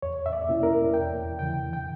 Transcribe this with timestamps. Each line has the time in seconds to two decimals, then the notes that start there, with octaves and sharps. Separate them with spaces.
0.02 E2 C#5
0.26 E5
0.33 D5
0.48 B2 A#3 C#4 E4
0.63 A#4
0.94 E2 G5
1.39 C#3 E3 G5
1.73 G5